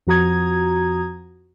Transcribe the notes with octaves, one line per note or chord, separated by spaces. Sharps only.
F2 F3 F#4 A#5 D#6 G#6